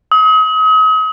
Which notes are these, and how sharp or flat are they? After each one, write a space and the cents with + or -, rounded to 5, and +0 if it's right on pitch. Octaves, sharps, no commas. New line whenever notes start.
D#6 +40